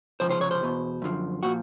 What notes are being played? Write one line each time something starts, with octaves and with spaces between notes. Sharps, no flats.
C#2 C3 F3 C5
C5
C#5
C5
E2 B2
F#2 D3 F3
A#2 F3 F#4